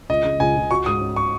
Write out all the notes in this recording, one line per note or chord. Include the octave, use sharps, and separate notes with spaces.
C#2 D#5
C#3
C#2 G#5
C#2
F#4 C#6
G#2 D#6
C#4
C#6